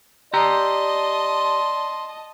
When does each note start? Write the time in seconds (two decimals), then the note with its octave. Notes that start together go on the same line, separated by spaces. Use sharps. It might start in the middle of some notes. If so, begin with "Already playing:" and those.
0.34 G4 D5 D#5 A5 A#5 C6